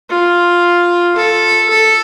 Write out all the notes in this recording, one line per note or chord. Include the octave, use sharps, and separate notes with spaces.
F4
A4
A4